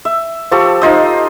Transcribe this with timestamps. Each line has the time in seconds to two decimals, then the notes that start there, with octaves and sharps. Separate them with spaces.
0.05 E5
0.51 F3 G4 A4 C#6
0.81 D#4 F4 C5 D#5